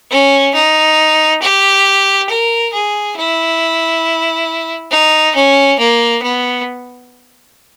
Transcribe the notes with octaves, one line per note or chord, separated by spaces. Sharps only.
C#4
D#4
G4
A#4
G#4
E4
D#4
C#4
A#3
B3